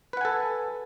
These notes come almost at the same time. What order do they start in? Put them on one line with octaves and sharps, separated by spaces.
B4 F#5 G#5 A4